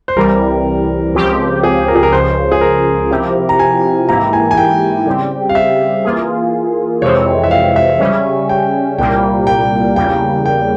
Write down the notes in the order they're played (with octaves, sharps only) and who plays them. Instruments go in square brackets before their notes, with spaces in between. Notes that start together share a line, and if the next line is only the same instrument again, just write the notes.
[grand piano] C5
[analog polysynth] C2 C3 E3 G3 [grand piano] A#4
[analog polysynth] C#2 C#3 F3 C4 G4
[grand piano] G#4
A#4
G#4
A#4
[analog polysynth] C#2 C#3 F3 [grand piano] C5
[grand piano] G#4
A#4
[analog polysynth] C3 F3 C4 E4 G4
[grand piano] A#5
G#5
[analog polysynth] G#2 E3 A#3 E4 G4 [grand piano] A#5
[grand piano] G#5
G#5
G5
[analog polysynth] C#3 G3 C4 G4
[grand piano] F5
E5
[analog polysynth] E3 A#3 F4 G#4
[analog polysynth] F2 C3 E3 G#3 C4 [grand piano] C#5
[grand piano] E5
F5
E5
[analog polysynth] C#3 G3 C#4
[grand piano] G5
[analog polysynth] C2 A#2 G3 A#3 [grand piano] G5
[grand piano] G5
[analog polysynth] E2 C#3 G3 A#3 [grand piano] G5
[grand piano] G5